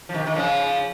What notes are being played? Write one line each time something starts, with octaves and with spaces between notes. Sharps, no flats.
F3
C3 D#3
D#3
C#3 F3